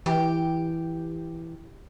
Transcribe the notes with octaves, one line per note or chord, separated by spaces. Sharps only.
E3 G4